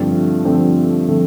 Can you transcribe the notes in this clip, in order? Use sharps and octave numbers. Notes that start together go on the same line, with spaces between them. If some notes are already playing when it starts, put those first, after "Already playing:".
Already playing: G2 D3 F3 A3 C4
G2 D3 F3 A3 C4
D3 F3 A3 C4